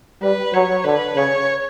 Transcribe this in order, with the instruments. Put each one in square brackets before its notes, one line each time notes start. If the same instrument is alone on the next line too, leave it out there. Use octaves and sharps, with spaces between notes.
[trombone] G3 [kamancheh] B4
[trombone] F#3 [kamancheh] C#5
[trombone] D3 [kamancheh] B4
[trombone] C#3 [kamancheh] C#5